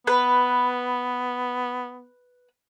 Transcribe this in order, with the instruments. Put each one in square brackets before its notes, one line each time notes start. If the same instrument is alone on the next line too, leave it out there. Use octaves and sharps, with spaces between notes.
[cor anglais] B3 [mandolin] B4